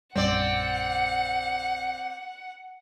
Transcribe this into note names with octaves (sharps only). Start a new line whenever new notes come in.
A#1 F#2 G3 C4 D5 F#5